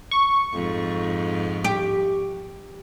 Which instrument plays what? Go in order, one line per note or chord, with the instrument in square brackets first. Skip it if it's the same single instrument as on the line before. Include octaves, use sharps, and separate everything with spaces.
[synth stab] C#6
[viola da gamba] F2 G#2
[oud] G4